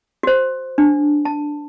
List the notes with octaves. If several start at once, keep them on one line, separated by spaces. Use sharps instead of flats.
F#4 C5
D4
A5